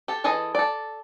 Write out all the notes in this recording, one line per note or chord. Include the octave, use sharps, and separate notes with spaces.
G4 A4
E3 G#4 A4 D#5
A4 D5